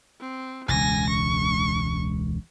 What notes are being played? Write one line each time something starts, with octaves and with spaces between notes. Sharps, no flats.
C4
E1 C#2 G#5 A#6
C#6